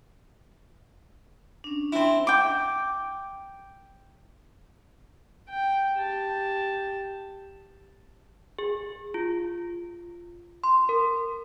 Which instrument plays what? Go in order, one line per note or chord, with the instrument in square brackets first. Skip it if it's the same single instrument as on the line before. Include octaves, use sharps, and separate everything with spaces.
[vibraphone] C#4 D4
[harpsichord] C4 E4
[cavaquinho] G5 D6
[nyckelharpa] G5
G4 A5
[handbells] G#4
F4
C6
A#4